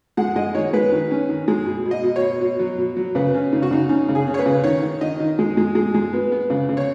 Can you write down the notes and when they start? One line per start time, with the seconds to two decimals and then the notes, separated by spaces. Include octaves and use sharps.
0.17 G#3 F#5
0.36 G#3 D#5
0.54 D#3 C#5
0.73 G#3 B4
0.92 D#3
1.11 C#4
1.29 D#3
1.48 G#3
1.66 B2
1.85 B2
1.91 D#5
2.03 B2
2.16 C#5
2.22 B2
2.41 B2
2.59 F#3
2.78 B2
2.97 F#3
3.15 C#3 B4
3.34 C#4
3.52 C#3 D#4
3.62 F#4
3.71 C#3 D#4
3.89 C#4 D#4
4.08 C#3
4.15 G#4
4.27 C#4
4.34 C#5
4.39 B4
4.46 C#3
4.64 D#3 C#5
4.83 D#3
5.01 D#3 D#5
5.20 D#3
5.39 G#3
5.57 G#3
5.75 G#3
5.94 G#3
6.13 B3
6.32 B3
6.50 C#3
6.69 C#3
6.77 C#5